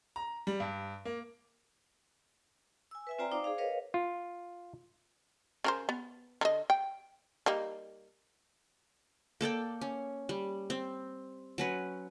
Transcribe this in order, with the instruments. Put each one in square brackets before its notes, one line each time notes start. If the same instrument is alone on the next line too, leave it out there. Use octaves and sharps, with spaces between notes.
[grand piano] A#5
G3
G2
A#3
[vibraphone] G#5 E6
B4 E5 G#5
C4 F4 C5 D5 G5 A#5
D#4 C5 D5 F5 D6
G#4 C5 F5
A#4 B4 C#5 D#5 F5
[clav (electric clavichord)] F4
[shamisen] C#3 A#4 C5
B3
D3 D#5
G5
G3 A#3 D#4
[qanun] A#3 A4 D5 G5
C#4
G3
C4
F#3 C#4 B4